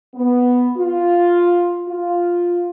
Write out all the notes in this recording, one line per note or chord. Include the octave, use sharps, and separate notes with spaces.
B3
F4
F4